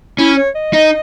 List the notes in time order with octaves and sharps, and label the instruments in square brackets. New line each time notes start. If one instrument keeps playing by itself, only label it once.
[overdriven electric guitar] C#4 [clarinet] E4
[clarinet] C#5
D#5
[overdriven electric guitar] D#4